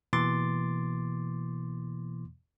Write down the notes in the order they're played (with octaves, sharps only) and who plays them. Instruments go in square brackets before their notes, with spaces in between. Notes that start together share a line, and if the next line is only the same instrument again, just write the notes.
[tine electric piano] B2 E3 A#3 C6 D6 A6